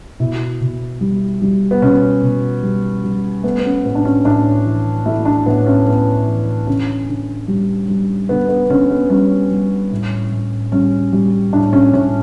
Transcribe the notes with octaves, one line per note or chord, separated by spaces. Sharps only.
B2 E4
B2
G3
G3
B3
B2 C#4
B2
G3
G3
A3 B3
B3
C#4
A2 B3
D4
C#4
A2 D4
E3
A3 E4
D4
A2 B3
C#4
A2 B3
E3
D3 C#4
D3
G3
G3
D3 B3
B3
D3 C#4
B3
G3 C#4
G3
A2
A2
G3 C#4
G3
A2 D4
C#4
A2 C#4